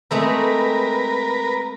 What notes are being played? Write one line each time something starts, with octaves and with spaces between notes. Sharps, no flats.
G#3 A3 C4 A#4 B4